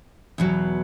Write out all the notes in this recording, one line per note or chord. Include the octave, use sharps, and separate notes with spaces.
E2 B2 F#3